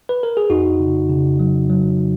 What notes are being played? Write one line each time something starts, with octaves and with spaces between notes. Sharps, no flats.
B4
A#4
G#4
F2 D#4 F#4
C#3
C#3
F#3
F#3